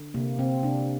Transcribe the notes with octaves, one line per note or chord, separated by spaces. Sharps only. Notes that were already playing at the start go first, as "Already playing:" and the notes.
Already playing: D3
C3 A#3
C3 C4
C3 D4